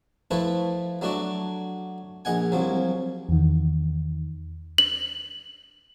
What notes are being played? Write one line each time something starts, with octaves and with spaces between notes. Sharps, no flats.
F3 A3 E4 A4 B4
F#3 A3 D4 F#4 D5
A#1 D#5 F#5 G#5
C2 F3 F#3
E2 D#3
F#7